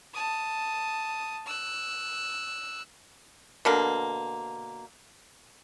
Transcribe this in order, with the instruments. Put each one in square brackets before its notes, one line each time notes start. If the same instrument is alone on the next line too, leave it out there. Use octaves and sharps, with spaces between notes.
[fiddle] A5 D#6
E6 F#6
[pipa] B2 D3 A#3